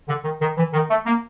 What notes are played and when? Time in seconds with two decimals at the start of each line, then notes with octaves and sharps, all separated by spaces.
0.08 D3
0.24 D#3
0.41 D#3
0.57 E3
0.73 D#3
0.89 A3
1.06 A#3